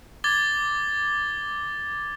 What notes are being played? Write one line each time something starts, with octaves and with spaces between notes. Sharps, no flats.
D6 G#6 A6 G7